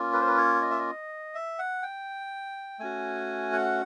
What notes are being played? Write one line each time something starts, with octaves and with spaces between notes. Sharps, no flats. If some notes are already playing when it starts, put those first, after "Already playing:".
Already playing: A#3 C#4 F4
B4
C5
B4
C#5
D#5
E5
D#5
E5
F#5
G5
A3 C#4 F#4 G#5
F#5